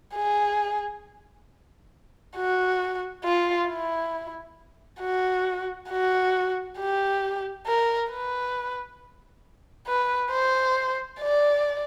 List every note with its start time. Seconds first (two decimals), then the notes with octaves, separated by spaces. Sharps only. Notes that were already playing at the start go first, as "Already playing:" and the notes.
0.15 G#4
2.37 F#4
3.24 F4
3.69 E4
5.01 F#4
5.90 F#4
6.78 G4
7.66 A#4
8.11 B4
9.87 B4
10.31 C5
11.20 D5